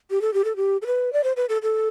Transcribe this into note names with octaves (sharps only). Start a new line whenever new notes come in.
G4
A4
G4
A4
G4
A4
B4
D5
C5
B4
A4
A4